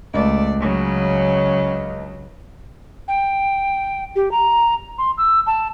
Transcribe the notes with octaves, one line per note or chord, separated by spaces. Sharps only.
C#2 A3 D5
C#3 F#3
G5
G4
A#5
C6
E6
A5